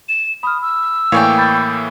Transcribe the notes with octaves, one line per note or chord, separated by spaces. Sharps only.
E7
B5 D#6 F6
E6
A2 E3 A#3 C#5 D5 F5 G5 G#5
B5 G6 A6